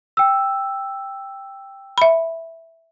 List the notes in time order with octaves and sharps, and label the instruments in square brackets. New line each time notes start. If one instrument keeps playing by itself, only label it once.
[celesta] G5 E6
[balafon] E5 B5